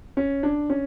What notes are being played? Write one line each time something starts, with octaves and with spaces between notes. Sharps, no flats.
C#4
D4
C#4